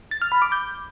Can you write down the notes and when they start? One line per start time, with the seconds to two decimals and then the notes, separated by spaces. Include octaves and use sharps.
0.11 A6
0.22 F6
0.32 B5
0.42 D6
0.52 G6